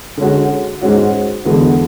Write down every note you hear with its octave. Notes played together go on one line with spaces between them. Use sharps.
D3 G#3 C#4 F#4
G#2 G#3 C#4 F#4
E2 D3 G#3 B3 F#4